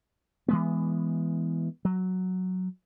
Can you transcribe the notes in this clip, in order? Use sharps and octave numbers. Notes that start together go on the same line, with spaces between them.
E3 G#3 B3
F#3